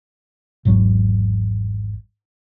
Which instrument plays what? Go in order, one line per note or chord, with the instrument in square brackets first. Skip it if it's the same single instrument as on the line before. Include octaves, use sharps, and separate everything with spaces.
[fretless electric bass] G#1 E2 F#3